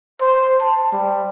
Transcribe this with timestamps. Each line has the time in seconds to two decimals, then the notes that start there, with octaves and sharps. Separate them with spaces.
0.21 C5
0.60 A5
0.92 G3